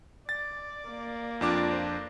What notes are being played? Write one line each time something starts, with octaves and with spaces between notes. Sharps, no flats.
D5 A6
A#3
F2 D4 F4 D5 D6
C5